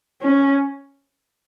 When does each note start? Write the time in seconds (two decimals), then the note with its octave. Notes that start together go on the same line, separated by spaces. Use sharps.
0.22 C#4